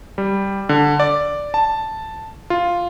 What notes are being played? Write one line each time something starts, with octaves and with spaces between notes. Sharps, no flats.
G3
D3
D5
A5
F4